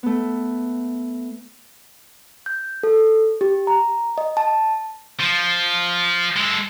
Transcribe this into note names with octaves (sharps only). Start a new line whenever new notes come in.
A3 B3
G6
A4
G4
A#5
D#5
A5
F3
G#3 A4